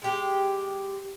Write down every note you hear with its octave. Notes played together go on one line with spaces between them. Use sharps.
G#3 G4